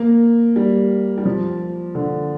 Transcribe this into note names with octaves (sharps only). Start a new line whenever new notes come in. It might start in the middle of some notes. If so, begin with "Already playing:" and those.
Already playing: A#3
G3
G3
F3
D3